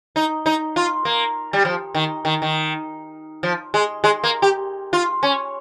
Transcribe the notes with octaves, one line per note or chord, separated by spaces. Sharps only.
D#4
D#4
F4
A#3
G3
F3
D#3
D#3
D#3
F3
G#3
G#3
A#3
G4
F4
C#4